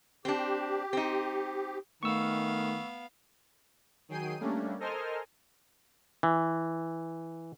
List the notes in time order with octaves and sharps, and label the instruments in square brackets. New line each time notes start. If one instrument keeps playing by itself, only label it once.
[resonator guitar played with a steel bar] C4 D4 [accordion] G4
[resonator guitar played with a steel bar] C4 D#4
[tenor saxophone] D#3 [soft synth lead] A3 [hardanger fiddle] B3 F5 [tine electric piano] C#6 E6
[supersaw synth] D#3 F#3 G#4 G5 C7 D#7
G3 A3 A#3 C#4 D4
A4 A#4 C5 D#5 G#5 F6
[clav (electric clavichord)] E3